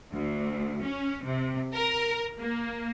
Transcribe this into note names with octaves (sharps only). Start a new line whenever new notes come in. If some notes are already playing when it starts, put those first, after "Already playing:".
D2
C#4
C3
A#4
A#3